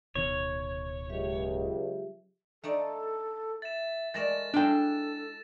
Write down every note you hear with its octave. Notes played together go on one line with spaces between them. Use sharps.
D1 B2 D#3 C#5
C#2 F#3 G4 E5
A3 D#4 A4 D5
E5 A6 E7
G#3 A3 A#4 D5 A6 A#6 E7
D4 E4 F4 G#4 A4 G5